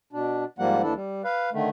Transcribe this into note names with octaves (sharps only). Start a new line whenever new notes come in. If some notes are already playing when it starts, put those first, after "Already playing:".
B2 D4
G#2 F3 G3 A#3 F#5
D#2 E3 D4 E4 A4
G3
B4 F5
D3 D#3 A3